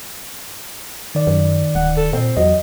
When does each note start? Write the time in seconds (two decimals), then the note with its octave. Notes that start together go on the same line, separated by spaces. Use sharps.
1.15 D#3 D5
1.27 F#2
1.75 D1 F#5
1.97 A4
2.13 A#2 C4
2.37 E2 F#3 D#5